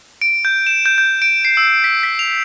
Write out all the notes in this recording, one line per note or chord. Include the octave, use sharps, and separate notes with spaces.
D7
G6
E7
G6
G6
D7
C7
E6
B6
B6
F7